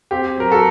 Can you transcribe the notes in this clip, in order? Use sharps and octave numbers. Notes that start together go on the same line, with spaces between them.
C4 G4
F#3 A#4
F#4 A4